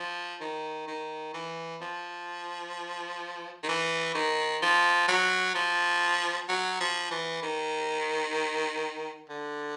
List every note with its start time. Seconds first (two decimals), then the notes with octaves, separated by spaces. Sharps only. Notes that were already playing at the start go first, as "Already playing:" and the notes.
Already playing: F3
0.41 D#3
0.88 D#3
1.34 E3
1.81 F3
3.63 D#3
3.68 E3
4.15 D#3
4.62 F3
5.08 F#3
5.55 F3
6.49 F#3
6.80 F3
7.11 E3
7.42 D#3
9.30 D3